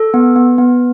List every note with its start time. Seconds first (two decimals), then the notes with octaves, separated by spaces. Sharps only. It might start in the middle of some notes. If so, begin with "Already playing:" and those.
Already playing: A4
0.14 B3
0.36 B3
0.58 B3